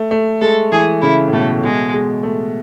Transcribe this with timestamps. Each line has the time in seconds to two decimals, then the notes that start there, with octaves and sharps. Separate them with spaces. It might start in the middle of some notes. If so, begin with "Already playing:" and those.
Already playing: A3
0.11 A3
0.41 G#3 A4
0.72 E3 G#4
1.02 C#3 E4
1.28 A2
1.33 B2 A3
1.64 B2 G#3
1.94 G#3
2.23 A3